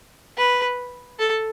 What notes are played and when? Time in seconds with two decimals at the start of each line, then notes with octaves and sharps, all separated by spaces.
0.37 B4
1.19 A4